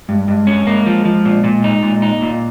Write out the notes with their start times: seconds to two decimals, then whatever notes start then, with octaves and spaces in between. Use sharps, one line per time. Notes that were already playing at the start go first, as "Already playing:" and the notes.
0.08 G2 G#3
0.18 G3
0.28 G2 G#3
0.47 C#4
0.67 G#3 A#3
0.86 F3
1.05 F3
1.25 A#2
1.44 A#2
1.64 D#4
1.83 A#2 G#3
2.02 D#4
2.12 A#3
2.22 A#2